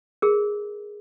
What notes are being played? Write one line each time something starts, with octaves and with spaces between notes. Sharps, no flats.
G#4 A#4